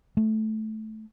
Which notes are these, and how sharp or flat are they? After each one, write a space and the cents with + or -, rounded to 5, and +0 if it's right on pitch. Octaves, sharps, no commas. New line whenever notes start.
A3 -10